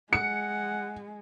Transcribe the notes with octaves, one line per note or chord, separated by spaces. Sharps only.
G#3 F#5 C#7